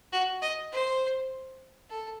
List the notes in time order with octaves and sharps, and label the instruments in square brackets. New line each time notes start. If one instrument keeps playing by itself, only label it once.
[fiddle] F#4
D#5
C5
A4